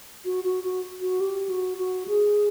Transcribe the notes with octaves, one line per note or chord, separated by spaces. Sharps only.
F#4
F#4
F#4
F#4
G4
F#4
F#4
G#4